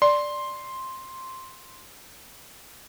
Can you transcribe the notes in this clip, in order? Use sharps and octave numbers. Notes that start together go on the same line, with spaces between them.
D5 C6